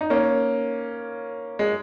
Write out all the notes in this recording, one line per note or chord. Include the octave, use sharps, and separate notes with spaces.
D#4
A#3 C#4
G#3